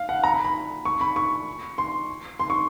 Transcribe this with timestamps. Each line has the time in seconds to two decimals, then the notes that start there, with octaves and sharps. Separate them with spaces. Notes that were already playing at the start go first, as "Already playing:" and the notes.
Already playing: F5
0.09 F#5
0.24 A#5
0.34 B5
0.44 B5
0.85 C#6
1.01 B5
1.16 C#6
1.78 C6
2.40 C6
2.50 C#6